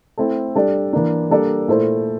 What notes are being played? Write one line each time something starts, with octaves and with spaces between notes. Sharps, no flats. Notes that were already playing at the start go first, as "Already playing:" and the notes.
A3 C4 E4 A4
G3 D4 A4 D5
E3 A#3 D4
G3 A#3 D4 A4 D5
A#2 A3 E4 A4 C5